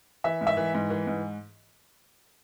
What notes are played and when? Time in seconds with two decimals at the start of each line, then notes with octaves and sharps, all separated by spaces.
0.24 E3 E5
0.41 G#2
0.47 E5
0.57 E3
0.74 G#2
0.90 E3
1.07 G#2